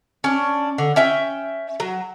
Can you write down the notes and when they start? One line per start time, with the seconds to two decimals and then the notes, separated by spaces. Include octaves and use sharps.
0.24 C#4 D4
0.78 D3
0.96 C#4 E5 G5
1.80 F#3